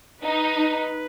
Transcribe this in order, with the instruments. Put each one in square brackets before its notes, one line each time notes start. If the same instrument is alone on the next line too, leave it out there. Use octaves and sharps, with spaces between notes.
[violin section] D#4 [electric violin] B4